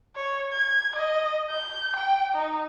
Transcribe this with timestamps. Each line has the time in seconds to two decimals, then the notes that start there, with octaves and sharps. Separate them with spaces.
0.16 C#5
0.52 G#6
0.95 D#5
1.50 G6
1.96 G5
2.34 D#4